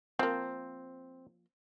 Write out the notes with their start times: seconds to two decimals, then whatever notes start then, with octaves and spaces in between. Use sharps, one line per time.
0.19 F3 A#3 C4